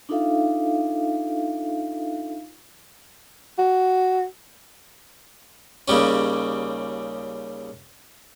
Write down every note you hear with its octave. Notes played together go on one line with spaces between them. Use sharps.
D4 D#4 F4 A4 E5 F5
F#4
D#2 C#3 G3 C#4